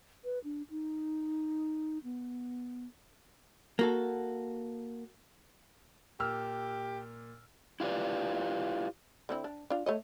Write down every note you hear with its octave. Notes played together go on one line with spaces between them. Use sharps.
B4
D4
D#4
B3
A#3 F#4 A4
A#2 G4 E6 F6
E4 F4 G4 B4 D5
D3 C4 E4
D4
D4 F4
A3 C#5 D#5